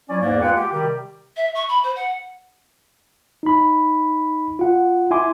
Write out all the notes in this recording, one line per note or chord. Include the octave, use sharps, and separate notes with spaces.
F#3 C#4 E4 D5
E2 G#2 E3 A#3 D5
G#3 A#3 F4 B4 F#5 G5
G4
C3 D#3 G3 G4
E5
C#6
B5
C5
F#5
D#4 B5
F4 F#5
E4 E5 G#5 C6 D6